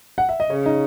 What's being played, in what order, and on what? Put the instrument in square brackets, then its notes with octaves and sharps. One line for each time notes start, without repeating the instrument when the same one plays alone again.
[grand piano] F#5
E5
D#5
[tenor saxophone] C#3 [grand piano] C#4 C#5
[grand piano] D#4 D#5